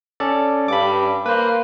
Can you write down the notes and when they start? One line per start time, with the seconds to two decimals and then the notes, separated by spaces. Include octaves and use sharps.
0.20 C#4 A4 D5
0.68 G2 B5 D6
1.26 A#3 B4 C5